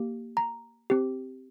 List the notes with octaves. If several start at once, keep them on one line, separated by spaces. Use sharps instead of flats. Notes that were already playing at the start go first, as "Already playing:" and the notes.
Already playing: A#3 G4
A#5
C4 G4